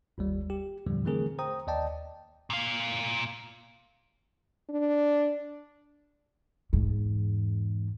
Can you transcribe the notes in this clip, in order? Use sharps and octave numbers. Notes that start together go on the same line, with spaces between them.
G1 D#2 G3
G4
E2 G2 A#2 D3 F3 G3
D3 E3 A3 C4 G#4 A#4
C5 G5 A#5 D#6
D#2 D5 D#5 G5 A5
A#2 F5
D4
E2 G#2